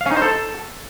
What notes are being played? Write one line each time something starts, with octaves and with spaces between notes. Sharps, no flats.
F5
C#4
D#4
C5
A4